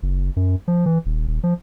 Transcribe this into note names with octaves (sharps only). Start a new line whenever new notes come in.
F#1
F#2
F3
E3
D#1
D#1
F3